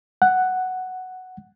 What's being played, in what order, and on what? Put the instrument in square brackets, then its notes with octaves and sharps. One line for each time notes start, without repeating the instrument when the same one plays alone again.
[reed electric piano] F#5